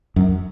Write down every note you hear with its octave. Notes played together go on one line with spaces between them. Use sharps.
F#2